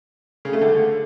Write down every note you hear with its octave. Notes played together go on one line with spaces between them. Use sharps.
C#3
A3
D3